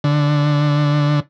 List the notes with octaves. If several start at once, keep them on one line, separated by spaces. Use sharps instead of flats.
D3